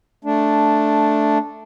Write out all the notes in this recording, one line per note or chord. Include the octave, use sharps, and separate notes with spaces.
A3 D4